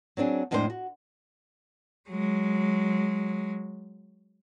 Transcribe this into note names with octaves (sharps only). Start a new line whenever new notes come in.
F#3 C4 D4 G#4
F2 A2 G#3 D4 G#4 C5
F#4
F#3 G#3